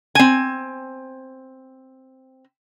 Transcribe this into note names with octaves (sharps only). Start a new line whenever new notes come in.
C4 G#5